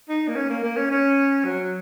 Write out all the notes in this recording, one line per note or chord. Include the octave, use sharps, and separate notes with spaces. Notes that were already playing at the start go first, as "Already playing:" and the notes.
D#4
A#3
C#4
A#3
A#3
C#4
C#4
F#3